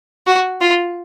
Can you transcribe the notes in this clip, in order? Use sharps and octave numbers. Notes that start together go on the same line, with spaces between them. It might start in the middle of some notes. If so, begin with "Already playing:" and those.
F#4
F4